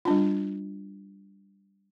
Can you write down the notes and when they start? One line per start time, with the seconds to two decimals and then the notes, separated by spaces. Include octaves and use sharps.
0.05 G3 D4 F4